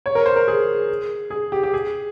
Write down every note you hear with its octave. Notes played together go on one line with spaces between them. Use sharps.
C#5
A#4
C5
A#4
G#4
G#4
G4
G4
G#4